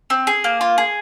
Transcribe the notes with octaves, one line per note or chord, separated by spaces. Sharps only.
C4
G#4
A#3
F4
G#4